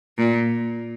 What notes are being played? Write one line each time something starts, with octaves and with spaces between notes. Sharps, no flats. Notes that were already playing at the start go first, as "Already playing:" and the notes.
A#2